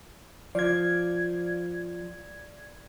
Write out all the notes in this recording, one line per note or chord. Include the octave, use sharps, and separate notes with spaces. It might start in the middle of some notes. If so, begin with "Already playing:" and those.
F3 D5 G#6